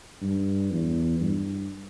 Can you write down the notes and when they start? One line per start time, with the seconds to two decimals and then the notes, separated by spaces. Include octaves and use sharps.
0.22 G2
0.71 E2
1.20 G2